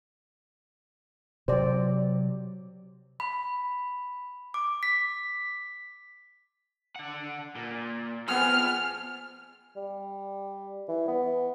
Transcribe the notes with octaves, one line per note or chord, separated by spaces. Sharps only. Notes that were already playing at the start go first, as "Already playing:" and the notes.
C3 F#3 C5 D5
B5
D6
B6
D3 F#5
A#2
F2 B3 G#4 F6
G3
E3
B3